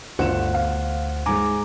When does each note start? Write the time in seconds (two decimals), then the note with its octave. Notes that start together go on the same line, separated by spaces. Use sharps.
0.19 G1 D2 C5 F#5 E7
0.54 F5
1.26 G#2 G#3 G#5 A#5 D6